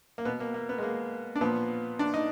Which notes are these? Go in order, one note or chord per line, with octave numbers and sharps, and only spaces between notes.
A#3
B2 B3
A#3
A#3
B3
G#3
A#3
D4
A#2 F3 B3
D4
D#4